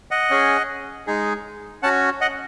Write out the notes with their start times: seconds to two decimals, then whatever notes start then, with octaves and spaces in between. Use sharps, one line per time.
0.11 D#5 F#5
0.30 C#4 G#4
1.07 G#3 D#4 G#4
1.83 C#4 F#5 A5
1.86 F#4
2.21 D#5 F#5